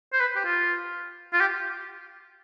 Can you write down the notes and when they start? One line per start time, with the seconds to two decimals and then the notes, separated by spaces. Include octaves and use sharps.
0.13 C5
0.20 B4
0.36 G4
0.45 F4
1.33 F4
1.41 G4